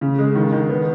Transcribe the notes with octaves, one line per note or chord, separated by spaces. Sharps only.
C#3
G#3
D#3
D#3
B3